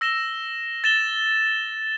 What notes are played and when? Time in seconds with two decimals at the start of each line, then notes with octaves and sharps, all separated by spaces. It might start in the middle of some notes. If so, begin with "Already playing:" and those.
0.01 E6 A#6 E7 G7
0.84 A6 E7 G7